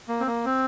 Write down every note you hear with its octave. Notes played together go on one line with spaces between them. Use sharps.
A#3
C4
A#3
C4